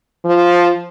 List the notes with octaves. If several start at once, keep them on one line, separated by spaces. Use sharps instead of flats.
F3